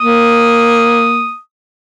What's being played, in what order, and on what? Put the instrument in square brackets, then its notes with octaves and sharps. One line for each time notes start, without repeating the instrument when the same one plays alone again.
[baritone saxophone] A#3 [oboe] D#6